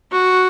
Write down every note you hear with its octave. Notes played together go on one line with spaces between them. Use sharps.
F#4